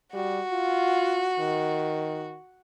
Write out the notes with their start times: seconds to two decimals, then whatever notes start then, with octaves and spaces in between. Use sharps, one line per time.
0.13 G3 F#4
0.51 F4
1.39 D#3